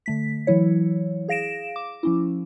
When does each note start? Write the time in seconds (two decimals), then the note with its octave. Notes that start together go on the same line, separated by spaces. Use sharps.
0.06 D3 A3 B6
0.47 E3 F#3 E4 C#5
1.28 G#4 F5 A#6 D7 E7
1.76 D6
2.03 F3 C#4 E4